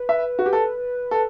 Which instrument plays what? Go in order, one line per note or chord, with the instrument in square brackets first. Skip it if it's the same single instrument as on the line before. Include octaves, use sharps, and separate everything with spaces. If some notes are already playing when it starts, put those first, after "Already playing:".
Already playing: [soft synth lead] B4
[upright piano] E5
F#4
G4
A4
A4